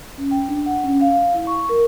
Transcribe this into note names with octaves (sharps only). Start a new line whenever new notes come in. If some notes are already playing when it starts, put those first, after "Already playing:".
C#4
G5
D4
F#5
C#4
F5
E4
C#6
A#4